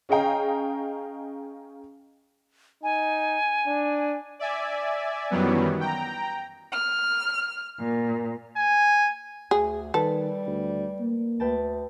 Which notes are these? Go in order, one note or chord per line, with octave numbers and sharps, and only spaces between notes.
C#4 G#4 D#5 F5 G5 A#5
D#4 G#5
D4
D5 E5 G#5
F#2 D#3 E3 F#3 G3 B3
G5 A#5
F6
A#2
G#5
D2 G#4
D#3 G3 A4 B4
D2
A#3
D2 B4 G5 A5